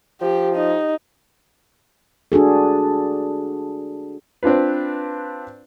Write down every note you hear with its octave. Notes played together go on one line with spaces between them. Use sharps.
F3 G4
D#4
D4 F#4 G#4 A4
C4 D4 F4 B4